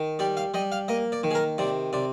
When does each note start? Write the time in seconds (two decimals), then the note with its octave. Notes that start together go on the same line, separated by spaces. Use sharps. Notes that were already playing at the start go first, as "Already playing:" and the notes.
Already playing: D#3
0.19 G3 D5
0.37 F5
0.54 G3 D#5
0.72 F5
0.88 A#3 D#5
1.12 D5
1.23 D#3
1.31 G#4
1.35 A#4
1.58 C3 D5
1.93 C3 D5